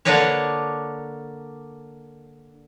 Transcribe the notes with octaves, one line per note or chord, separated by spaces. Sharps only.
D3 A#3 D4 A#4 B4 C#5